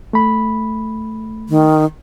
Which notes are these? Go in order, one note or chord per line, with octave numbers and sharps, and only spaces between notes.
A3 B5
D#3